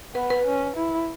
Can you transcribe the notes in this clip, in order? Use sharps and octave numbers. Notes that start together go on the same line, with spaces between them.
B3 B4
B4
C#4
E4